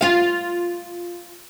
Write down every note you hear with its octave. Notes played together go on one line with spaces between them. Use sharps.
F4 F5